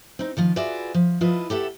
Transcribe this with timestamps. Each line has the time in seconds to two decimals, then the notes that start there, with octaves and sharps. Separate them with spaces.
0.19 C4 D#4
0.37 D#3 F3 F4
0.56 F4 F#4 G#4 B4 D5 E5
0.94 F3
1.21 F3 E4 F4 B4 D#5
1.50 G4 A4 E5 F#5